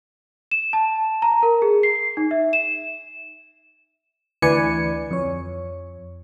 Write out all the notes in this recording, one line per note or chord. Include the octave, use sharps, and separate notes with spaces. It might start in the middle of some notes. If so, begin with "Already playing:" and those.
E7
A5
A#5
A#4
G#4
C7
D#4
E5
E7
D2 E3 B4 D5 G#5 C#7
F2 C#5